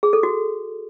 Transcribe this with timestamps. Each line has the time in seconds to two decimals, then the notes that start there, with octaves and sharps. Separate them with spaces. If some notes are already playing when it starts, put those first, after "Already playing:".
0.03 G#4
0.13 A4
0.23 F#4